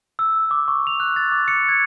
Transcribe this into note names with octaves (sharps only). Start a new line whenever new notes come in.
E6
D6
C#6
F7
F#6
A6
D6
C#7
G#6